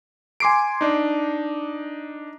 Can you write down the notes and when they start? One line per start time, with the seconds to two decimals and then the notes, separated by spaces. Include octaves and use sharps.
0.40 G#5 C6 D6 C7 D7
0.81 D4 D#4